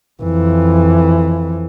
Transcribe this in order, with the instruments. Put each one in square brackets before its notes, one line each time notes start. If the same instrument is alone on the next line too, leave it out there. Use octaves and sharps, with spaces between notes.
[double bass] F2 E3